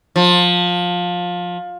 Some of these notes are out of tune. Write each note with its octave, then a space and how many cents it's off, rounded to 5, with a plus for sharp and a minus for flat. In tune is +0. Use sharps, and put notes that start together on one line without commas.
F3 +20